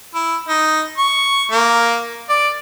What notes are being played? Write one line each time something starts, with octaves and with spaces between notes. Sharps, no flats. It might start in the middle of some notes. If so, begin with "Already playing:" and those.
E4
D#4
C#6
A#3
D5